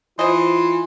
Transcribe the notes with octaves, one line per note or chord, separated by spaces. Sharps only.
E3 F4 C5 D#5 C6